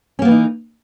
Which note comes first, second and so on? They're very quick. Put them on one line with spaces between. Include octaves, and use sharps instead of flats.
C#4 A#3 B3 E3 D#4